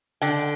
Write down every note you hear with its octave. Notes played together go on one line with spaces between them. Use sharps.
D3 G5